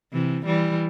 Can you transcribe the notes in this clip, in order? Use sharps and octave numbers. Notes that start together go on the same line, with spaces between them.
C3 E3
E3 G3